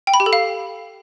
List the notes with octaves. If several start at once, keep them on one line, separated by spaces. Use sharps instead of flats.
G5
B5
G4
A4
F5